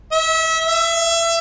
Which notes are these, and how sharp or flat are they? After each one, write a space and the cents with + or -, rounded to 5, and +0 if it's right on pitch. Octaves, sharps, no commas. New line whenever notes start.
E5 -30
E5 +25